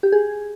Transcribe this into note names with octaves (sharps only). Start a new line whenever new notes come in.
G4
G#4